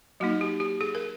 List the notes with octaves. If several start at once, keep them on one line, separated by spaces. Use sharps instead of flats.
F#3 A#3 D#4 F#4
G4
G4
G#4
A#4